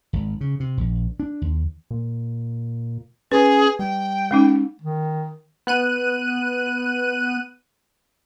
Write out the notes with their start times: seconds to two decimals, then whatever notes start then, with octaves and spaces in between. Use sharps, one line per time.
0.13 G#1
0.41 C#3
0.60 C3
0.77 A#1
1.20 D4
1.41 D#2
1.91 A#2
3.32 C#4 G#4 B4
3.79 G3 G5
4.31 G#3 C#4 D#4
4.82 D#3
5.67 B3 F#6 D#7